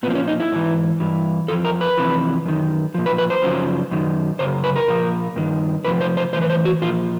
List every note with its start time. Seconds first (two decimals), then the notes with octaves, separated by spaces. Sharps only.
0.03 A#2 B3
0.07 F3 C4
0.15 C#4
0.28 D#4
0.40 E4
0.52 G#2 E3
1.00 G2 E3
1.48 F2 C#3 F3 A4
1.65 A#4
1.81 B4
1.97 F2 C3 E3
2.46 F#2 D#3
2.94 A#2 F3
3.06 B4
3.18 B4
3.30 C5
3.42 F#2 C#3 F3
3.91 F#2 D#3
4.39 F#2 C#3 C5
4.64 B4
4.76 A#4
4.88 A#2 F3
5.36 G2 D#3
5.85 F2 C3 F3 B4
6.01 C5
6.17 C5
6.33 A2 E3 C5
6.41 B4
6.50 C5
6.65 F#4
6.82 A#2 F3 F4